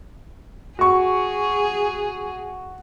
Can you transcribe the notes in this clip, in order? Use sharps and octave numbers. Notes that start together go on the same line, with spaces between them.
F#4 G#4 C#6